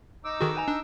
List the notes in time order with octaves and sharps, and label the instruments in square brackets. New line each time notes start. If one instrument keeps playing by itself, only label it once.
[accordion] D#4 D6 E6
[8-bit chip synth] D#3 F#4 [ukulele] G#4 A4 B4
[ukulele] B4 G#5 A#5
[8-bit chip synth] D4